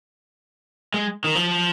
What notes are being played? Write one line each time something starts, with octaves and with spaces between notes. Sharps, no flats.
G#3
D#3
F3